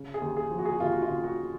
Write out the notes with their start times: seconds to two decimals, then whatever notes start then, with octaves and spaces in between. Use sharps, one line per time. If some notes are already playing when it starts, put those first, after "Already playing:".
Already playing: C#3
0.14 G#4
0.22 D#2
0.37 G#4
0.51 F3
0.59 F#4
0.65 G#4
0.72 F#4
0.80 D#2 F4
0.92 F#4
1.02 F4
1.10 C#3
1.24 F#4